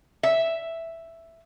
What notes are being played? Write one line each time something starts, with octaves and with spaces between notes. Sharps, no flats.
E5